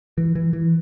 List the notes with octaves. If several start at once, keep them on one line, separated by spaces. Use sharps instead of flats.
E3
E3
E3